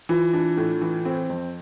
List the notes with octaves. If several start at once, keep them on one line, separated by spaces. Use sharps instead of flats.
E3 F4
D4
A2
E3
C4
F2